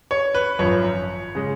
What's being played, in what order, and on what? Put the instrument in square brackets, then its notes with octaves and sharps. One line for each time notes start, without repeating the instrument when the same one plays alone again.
[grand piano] C#5
B4
G#1 F#2 F3 C#5
C#3 G#3